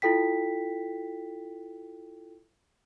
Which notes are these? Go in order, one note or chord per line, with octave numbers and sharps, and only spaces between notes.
E4 F4 A4 G5 B6